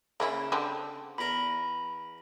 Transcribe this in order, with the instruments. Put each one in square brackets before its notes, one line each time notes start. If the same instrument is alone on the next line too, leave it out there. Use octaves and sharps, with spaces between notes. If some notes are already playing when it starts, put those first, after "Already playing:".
[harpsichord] C#3 [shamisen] A#3 C#4 E4
[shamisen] D3 G3 C4
[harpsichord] E2 A#4 [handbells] B5